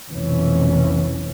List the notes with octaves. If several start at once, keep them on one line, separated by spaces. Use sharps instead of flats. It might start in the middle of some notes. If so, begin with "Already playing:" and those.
F1 B1 F2 E3 C#4